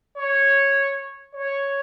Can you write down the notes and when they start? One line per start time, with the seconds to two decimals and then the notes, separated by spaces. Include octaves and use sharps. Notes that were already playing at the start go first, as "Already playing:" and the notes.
0.16 C#5
1.34 C#5